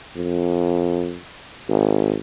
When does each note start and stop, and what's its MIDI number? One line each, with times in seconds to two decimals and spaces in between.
0.16 1.20 41
1.69 2.18 32